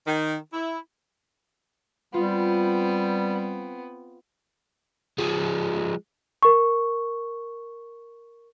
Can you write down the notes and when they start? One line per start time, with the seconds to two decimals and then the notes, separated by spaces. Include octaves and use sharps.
0.07 D#3
0.53 E4
2.14 G3 B3 C4 F4
5.19 F3 G#3
6.43 A#4 C#6